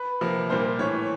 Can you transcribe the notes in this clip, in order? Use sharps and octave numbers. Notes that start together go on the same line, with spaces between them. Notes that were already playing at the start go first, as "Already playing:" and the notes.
Already playing: B4
C3 F3 A#3
A#2 G3 A#3 C5
A2 E3 A3 C#5